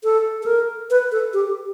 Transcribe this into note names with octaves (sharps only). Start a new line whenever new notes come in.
A4
A4
A#4
B4
A4
G4